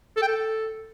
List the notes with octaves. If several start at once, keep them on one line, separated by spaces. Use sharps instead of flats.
A4
G5
A4